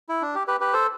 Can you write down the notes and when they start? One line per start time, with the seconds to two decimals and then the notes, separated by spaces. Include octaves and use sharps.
0.09 E4
0.22 D4
0.35 G4
0.47 G4 B4
0.60 G4 B4
0.73 A4 C5